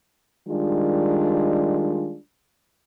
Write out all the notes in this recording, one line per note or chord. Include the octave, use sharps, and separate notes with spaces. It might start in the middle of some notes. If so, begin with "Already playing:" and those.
D#3 G3 G#3 D4 F4